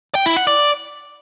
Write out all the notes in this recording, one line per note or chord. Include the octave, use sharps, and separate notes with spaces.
G5
E4
F#5
D5